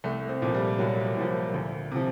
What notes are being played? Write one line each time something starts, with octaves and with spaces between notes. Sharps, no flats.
C2 A3
C4
A#2 F3
G3
C2 F#3
A#2 F3
D2
C3 F3